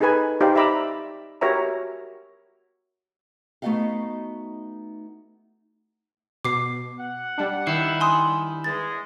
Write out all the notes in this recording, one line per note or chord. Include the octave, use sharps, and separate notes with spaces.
D#4 G#4 A4 B4 G#5 B5
D#4 G4 C5 D5 F5
D5 E5 A#5 B5 D6 E6
F#4 G4 A#4 C#5 E5 A#5
A3 B3 D#4 F#4 D#5 F5
B2 D6 C7
F#5
G3 D4
D#3 E4 C7
G#5 C6 D#6
E2 G#3 A6